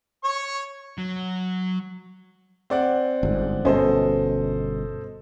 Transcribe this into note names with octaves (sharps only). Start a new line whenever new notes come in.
C#5 C#6
F#3
C4 D5 F#5
G1 G#2
G1 B2 C#4 A4 C5 D#5